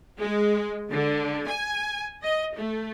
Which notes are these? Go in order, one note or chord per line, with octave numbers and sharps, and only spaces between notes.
G#3
D3
G#5
D#5
A3